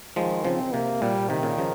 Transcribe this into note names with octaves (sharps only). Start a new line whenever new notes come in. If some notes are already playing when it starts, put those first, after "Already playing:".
D#3 F3 G#3
C#3 F3 C4
C3 A#3
A#2 G3
C3 D#3
A#2 C#3
C#3 F3